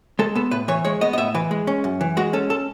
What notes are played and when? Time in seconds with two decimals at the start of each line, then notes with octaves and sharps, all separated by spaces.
0.19 G#3 A4
0.35 B3 A4
0.51 A2 B4
0.68 E3 C#5
0.85 G#3 C#5
1.01 B3 D#5
1.13 D#5
1.18 A2 E5
1.34 E3 B4
1.51 G#3
1.67 C#4
1.84 F#2
2.01 E3
2.17 G#3 F#4
2.33 C#4 A4
2.50 A4